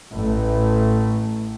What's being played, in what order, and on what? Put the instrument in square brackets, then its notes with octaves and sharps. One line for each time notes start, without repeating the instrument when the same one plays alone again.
[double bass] A1 A3